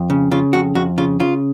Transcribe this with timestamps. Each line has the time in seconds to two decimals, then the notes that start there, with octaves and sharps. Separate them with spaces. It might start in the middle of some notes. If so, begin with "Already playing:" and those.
Already playing: F2
0.10 C#3
0.31 C#3 F4
0.53 F2 F#4
0.75 F2 F#4
0.98 C#3 F4
1.20 C#3 F4